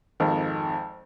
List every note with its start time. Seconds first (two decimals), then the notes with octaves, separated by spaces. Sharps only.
0.20 G#1 F2 D#3